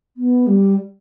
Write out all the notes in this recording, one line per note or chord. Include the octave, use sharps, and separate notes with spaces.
B3
G3